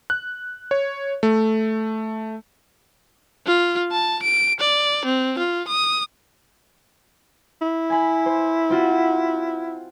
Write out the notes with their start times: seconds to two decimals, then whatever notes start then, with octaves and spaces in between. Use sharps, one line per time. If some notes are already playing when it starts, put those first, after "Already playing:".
0.10 F#6
0.71 C#5
1.23 A3
3.47 F4
3.92 A5
4.23 D7
4.60 D5
5.05 C4
5.39 F4
5.68 D#6
7.62 E4
7.90 G#5 B5
8.26 C5
8.70 C4 F4 F#4